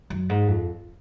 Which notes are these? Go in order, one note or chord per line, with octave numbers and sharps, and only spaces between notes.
F#2
G#2
F2